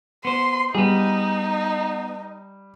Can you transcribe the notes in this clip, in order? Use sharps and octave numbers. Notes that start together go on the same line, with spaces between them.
B3 C5 C6
G3 B3 D#4 G#4